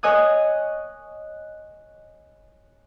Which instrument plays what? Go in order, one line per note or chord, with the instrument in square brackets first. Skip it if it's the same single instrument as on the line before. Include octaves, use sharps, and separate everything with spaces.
[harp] C#5 D#5 G#5 D#6 F#6